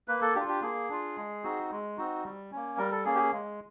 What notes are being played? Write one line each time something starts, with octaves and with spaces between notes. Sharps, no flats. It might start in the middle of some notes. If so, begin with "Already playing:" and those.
A#3 B4
A4
D4 F4 G4
G4
A#3 G#4
D4 F4
G#3
C4 D#4 F#4
G#3
C4 D#4 F#4
G3
A#3 C#4
G3 A#4
A4
A#3 C#4 G#4
G4
G#4
G#3